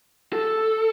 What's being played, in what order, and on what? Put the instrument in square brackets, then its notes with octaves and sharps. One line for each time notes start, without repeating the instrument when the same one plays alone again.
[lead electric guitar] A4